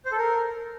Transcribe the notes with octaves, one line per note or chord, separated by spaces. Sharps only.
C5
A4
A#4